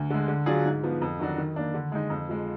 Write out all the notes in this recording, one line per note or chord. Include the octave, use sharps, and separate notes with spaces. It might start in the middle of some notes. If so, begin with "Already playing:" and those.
Already playing: D2
D3 G#3
D3
F#3 D4 F4 G#4
G#2
F3 B3
F2
D#3 F#3 D4 F#4
D#3
A#3 D4
D3
G#3 D#4
F2
F3 G#3